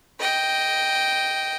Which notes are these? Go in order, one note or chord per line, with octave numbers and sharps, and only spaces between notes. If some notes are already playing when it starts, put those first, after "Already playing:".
D#5 G5